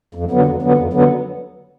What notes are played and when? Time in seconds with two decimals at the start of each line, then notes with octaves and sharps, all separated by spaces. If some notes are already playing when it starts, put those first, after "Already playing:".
0.15 F2
0.31 D3 F#3 B3
0.46 F2
0.62 D3 F#3 B3
0.77 F2
0.93 D3 F#3 B3